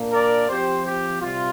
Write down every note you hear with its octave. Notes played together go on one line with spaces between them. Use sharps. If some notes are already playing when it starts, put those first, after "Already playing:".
Already playing: A#2 A#3 D4
A#4 D5
F3 C4 G4 C5
G4
C3 G3 F4